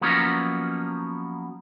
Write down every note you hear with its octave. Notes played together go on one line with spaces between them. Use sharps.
F3 F#3 A#3 B3 C#4 D#4